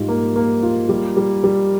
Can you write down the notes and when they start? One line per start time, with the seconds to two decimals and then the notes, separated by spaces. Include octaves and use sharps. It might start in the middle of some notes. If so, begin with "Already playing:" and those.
Already playing: G#2 G3 F4
0.08 A#3
0.36 A#3
0.63 F4
0.89 G3
1.17 G3
1.44 G3